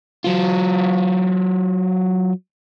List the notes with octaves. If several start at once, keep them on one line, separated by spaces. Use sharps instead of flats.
F#3 F4